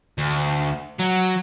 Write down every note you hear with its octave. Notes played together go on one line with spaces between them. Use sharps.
D2
F#3